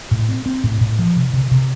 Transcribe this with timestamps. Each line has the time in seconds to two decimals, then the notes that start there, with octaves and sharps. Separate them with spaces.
0.11 A2
0.29 C4
0.46 C4
0.64 A2
0.81 A2
0.99 F3
1.16 C3
1.33 C3
1.51 C3